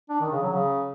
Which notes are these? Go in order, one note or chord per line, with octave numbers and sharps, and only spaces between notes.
D4
D#3
C#3
F#3
C#3